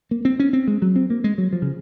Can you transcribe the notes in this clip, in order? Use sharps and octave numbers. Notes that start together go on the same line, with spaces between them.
A#3
C4
C#4
C4
G#3
F#3
C4
A#3
G#3
F#3
F3
C#3